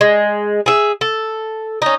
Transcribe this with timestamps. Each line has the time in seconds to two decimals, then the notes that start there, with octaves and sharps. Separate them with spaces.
0.01 G#3
0.66 G#4 E5
1.01 A4
1.82 C#4 D#4